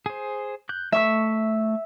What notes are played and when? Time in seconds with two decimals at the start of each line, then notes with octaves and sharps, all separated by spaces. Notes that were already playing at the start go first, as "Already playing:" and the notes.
0.06 G#4 C5
0.69 F#6 G6
0.92 A3 E5 C#6 E6